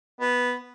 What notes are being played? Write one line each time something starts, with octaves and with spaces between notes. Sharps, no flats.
B3